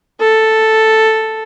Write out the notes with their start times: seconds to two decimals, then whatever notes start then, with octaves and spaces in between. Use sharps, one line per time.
0.20 A4